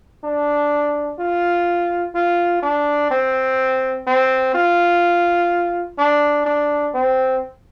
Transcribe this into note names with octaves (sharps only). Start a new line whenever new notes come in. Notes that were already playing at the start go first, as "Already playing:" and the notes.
D4
F4
F4
D4
C4
C4
F4
D4
D4
C4